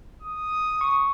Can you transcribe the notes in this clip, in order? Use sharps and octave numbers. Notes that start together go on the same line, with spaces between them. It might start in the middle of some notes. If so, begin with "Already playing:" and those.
D#6
C#6